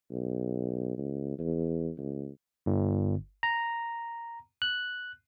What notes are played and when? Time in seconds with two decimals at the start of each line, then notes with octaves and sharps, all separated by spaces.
0.11 B1
0.98 C#2
1.39 E2
1.98 C#2
2.66 G1
3.43 A#5
4.62 F#6